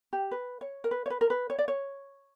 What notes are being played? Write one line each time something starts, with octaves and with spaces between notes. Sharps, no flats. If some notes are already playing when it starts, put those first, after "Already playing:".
G4
B4
C#5
A#4
B4
C#5
B4
A#4
B4
C#5
D5
C#5